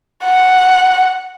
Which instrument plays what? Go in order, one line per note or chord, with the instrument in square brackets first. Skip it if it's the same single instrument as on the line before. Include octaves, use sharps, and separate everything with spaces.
[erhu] F#5